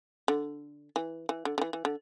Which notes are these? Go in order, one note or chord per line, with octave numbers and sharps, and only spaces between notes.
D3
E3
E3
D3
D3
E3
E3
D3